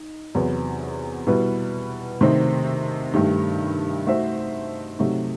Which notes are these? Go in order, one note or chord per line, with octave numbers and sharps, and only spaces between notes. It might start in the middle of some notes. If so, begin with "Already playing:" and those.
Already playing: D#4
E2 C3 F#3 B3
B2 G3 B3 E4 B4
C3 D#3 A3 C4 D#4
G2 D#3 A3 D#4 G4
A3 D#4 F#4 C5 E5
C3 F#3 A3 D#4 G4